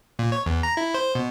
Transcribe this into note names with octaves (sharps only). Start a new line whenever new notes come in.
A#2
C#5
E2
A#5
E4
C5
B2